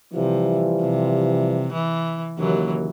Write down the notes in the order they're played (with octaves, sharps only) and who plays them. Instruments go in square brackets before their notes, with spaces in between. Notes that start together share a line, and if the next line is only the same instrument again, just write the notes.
[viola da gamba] C3 [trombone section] E3 F3 G3
[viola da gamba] C3
E3
[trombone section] D#2 [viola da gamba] C#3 E3 F#3